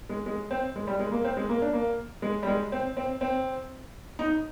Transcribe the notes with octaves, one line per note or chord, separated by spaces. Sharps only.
G#3
G#3
C4
G#3
G3
G#3
A#3
C4
G#3
A#3
D4
A#3
G#3
G3
G#3
C4
C4
C4
D#4